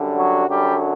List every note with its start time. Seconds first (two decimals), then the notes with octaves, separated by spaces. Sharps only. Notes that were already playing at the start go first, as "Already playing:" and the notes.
Already playing: F#2 D3 G3
0.15 F#3 F#4
0.48 F#2 D3 F#3 G3 G4